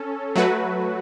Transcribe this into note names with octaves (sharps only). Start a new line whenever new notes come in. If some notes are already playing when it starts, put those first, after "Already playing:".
Already playing: C#4 A4
F#3 A3 F#4 B4